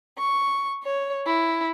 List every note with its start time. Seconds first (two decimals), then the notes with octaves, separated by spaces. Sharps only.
0.18 C#6
0.83 C#5
1.26 E4